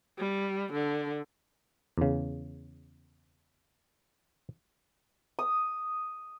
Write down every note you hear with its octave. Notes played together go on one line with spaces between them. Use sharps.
G3
D3
E2 C#3
D#6